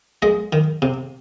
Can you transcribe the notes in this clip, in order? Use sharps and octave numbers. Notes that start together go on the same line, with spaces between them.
G#3 D#5
D#3
C3